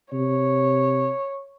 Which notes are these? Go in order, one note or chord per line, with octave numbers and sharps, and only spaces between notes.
C3 C#5